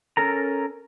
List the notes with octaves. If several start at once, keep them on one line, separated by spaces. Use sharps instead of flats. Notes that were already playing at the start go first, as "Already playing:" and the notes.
C#4 A4 A#4 A#5